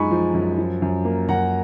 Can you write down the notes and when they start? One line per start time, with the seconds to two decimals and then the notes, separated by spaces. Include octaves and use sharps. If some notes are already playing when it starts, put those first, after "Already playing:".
Already playing: F#2 F3 G#3 D#4 G#5 B5 C#6
0.11 F3
0.34 F#2
0.58 F3
0.82 F#2
1.05 A#3
1.29 F#2 F#5 A#5